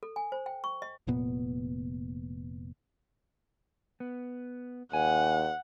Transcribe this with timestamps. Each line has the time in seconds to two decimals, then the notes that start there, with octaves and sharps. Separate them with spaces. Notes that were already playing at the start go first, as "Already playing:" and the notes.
0.03 A4
0.16 G#5
0.32 C5
0.46 G5
0.64 C#6
0.82 D#5
1.07 F1 A#2 B3
4.00 B3
4.93 D#2 F#5 G#5